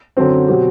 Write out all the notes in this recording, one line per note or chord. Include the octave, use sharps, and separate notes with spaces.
F#2 D3 F#3 C4
B2 F#3 C4 G4